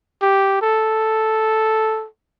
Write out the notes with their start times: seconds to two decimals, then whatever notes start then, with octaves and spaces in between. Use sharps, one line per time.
0.22 G4
0.62 A4